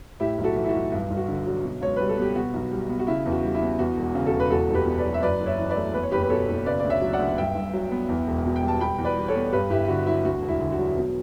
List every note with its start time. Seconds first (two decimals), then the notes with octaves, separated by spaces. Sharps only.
0.20 A2 E4 G4
0.38 B1
0.44 F#4 A4
0.56 E3
0.64 E4
0.69 F#4
0.75 B1
0.92 G2
1.10 G1
1.17 F#4
1.28 D3
1.46 F#3
1.64 B2
1.81 C#2 C#5
1.96 G3 B4
2.09 A4
2.18 B3 G4
2.35 B2 F#4
2.54 B1
2.71 G3
2.89 B3
2.99 F#4
3.07 C#3 E4
3.26 E2
3.31 F#4
3.44 G3
3.55 E4
3.62 B3
3.79 E2 F#4
3.97 E1
4.03 F#4
4.15 C#3
4.26 F#4 A4
4.32 E1
4.40 B4
4.50 E2 F#4 A4
4.69 F#1 A4
4.74 G4 B4
4.86 B2
4.98 B4 D5
5.05 F#3
5.14 E5
5.22 F#2 B4 D5
5.40 F#1
5.46 C#5 E5
5.58 E3
5.70 B4 D5
5.76 A3
5.94 E2 B4
6.03 C#5
6.11 F#1 G4 B4
6.23 B4
6.30 B2 A4 C#5
6.48 F#1
6.66 C#3 B4 D5
6.80 D2 D5
6.90 C#5 E5
7.02 F#3
7.13 D5 F#5
7.19 D2
7.38 G2 E5 G5
7.55 G1
7.73 F#3
7.91 B3
8.09 E2
8.27 E1
8.45 B2
8.56 G5
8.62 G3
8.68 A5
8.80 B2 G5 B5
8.98 E2
9.04 B4 D5
9.16 G3
9.28 A4 C#5
9.35 B3
9.53 G2 G4 B4
9.70 G1 E4 G4
9.88 D3 F#4
10.06 F#3 E4
10.24 D2 F#4
10.42 E1
10.48 E4
10.61 D3
10.72 F#4
10.78 F#3
10.97 B2